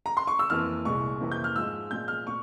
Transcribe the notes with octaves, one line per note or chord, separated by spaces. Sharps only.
A#5
C6
C#6
E6
F2 E3 A#3 F6
C2 A#2 G#3 C#6
F2 C3 E3 A#3
G6
F6
G#2 F3 G#3 E6
A#2 F3 G#3 G6
F6
A#2 C#6